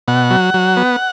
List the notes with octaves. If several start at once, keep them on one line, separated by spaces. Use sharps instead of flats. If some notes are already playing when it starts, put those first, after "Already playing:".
B2 F#5
F#3
F#3
B3